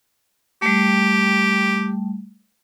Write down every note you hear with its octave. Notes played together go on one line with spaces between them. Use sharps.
G3 A3 G4